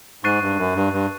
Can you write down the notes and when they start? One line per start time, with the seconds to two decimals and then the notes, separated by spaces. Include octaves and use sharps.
0.24 G#2 C#6 F#6 A6 C7 D#7
0.42 G2
0.58 F#2
0.76 G2
0.93 G2